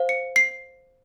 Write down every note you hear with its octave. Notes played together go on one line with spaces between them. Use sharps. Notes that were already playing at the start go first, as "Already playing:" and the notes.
Already playing: C5 F5
C#7
C7